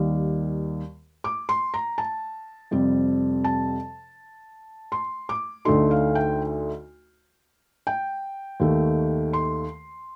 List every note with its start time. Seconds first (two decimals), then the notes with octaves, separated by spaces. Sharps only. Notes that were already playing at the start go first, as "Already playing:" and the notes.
Already playing: D#2 D#3 G3
1.24 D6
1.49 C6
1.74 A#5
1.98 A5
2.71 F2 C3 G3 C4
3.44 A5
4.92 C6
5.29 D6
5.65 D2 D3 A3 D#4 C6
5.91 F5
6.15 G5
7.87 G5
8.60 D#2 D#3 A3
9.33 C6